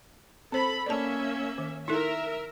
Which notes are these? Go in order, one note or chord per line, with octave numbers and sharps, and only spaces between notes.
C4 A4 C5 B5
A#3 C#4 D5 E5 A5
D#3
D#4 E4 A4 A#4 E5